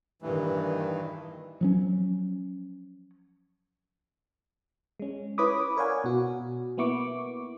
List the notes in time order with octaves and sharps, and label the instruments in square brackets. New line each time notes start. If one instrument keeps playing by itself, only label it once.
[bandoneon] G2 E3 [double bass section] A#2 D#3
[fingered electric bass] F3 F#3 C#4
[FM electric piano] G#3 C#4
E4 B4 C#5 B5 D6 D#6
A#4 C#5 D5 F5 F#5 G#5
B2 F#4
A#3 B3 E4 C#6 D6